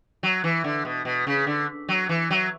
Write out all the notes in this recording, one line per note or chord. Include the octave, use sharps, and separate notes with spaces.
F#3
E3
D3
B2
B2
C#3
D3
F#3
E3
F#3